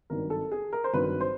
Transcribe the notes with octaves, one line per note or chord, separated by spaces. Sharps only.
G#1 G2 D#3 F#3 A#4
A4
G#4
A#4
C5
G#1 G2 D#3 F#3 B4
C5